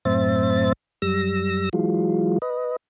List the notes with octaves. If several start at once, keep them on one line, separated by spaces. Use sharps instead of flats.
F#2 A2 C4 C5 E5 A6
F#2 G3 E6 A#6
E3 F#3 G#3 F4
B4 D#5